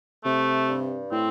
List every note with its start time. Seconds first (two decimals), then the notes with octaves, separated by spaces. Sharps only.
0.25 C3 A3
0.68 G2
1.12 A2 C4